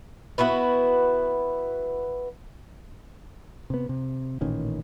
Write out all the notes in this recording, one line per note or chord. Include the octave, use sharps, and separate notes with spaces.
B3 E4 F#4 B4
C3 B3
C3
A1 A#2 D#3 C#4